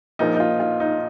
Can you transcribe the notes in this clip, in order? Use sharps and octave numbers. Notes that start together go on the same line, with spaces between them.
A#1 A#2 F3 A#3 D#4
D#4
F4
F4
D#4